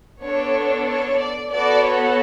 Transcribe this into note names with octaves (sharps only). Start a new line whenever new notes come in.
B3 D4 A4 C#5
C#5
D5
B3 F#4 A4 D5
C#5